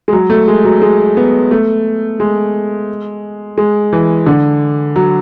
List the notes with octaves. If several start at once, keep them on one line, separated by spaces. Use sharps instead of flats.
G#3
F#3
A3
G#3
F#3
G#3
B3
A3
G#3
G#3
E3
D3
F#3